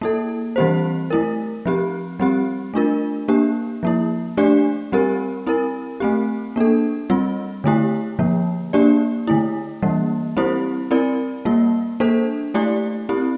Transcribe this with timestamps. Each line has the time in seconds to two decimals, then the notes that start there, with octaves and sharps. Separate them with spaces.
0.01 A#3 E4 A4
0.56 E3 G3 C4 G4 C5
1.10 A3 E4 A#4
1.66 F3 C4 G4
2.20 G3 C4 G4
2.74 A3 D4 F4 A#4
3.28 A#3 D4 G4
3.83 F3 A#3 E4
4.37 A3 D4 G4 D5
4.92 G3 C4 G4 A#4
5.47 C4 E4 A#4
6.00 A3 C4 G4
6.56 A#3 D4 A4
7.10 G3 C4 F4
7.64 D3 A3 E4 G4
8.19 D3 F3 A#3
8.73 A#3 D4 G4 D5
9.27 D3 A3 E4
9.82 E3 G3 A#3
10.37 G3 C4 E4 G4 C5
10.91 C4 E4 A#4 D5
11.45 G3 A#3 F4
12.00 A#3 D4 A4 C5
12.54 A3 E4 G4 D5
13.09 C4 E4 G4